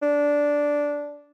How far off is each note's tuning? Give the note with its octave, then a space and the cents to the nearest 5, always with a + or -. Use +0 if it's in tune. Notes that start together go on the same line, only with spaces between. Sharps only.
D4 -10